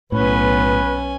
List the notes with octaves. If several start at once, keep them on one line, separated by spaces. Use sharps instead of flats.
B1 A2 B3 C#4 B4 G#5